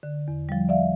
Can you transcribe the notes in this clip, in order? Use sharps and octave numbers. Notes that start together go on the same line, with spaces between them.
D3
E2
F3 G3
D5 E5 F5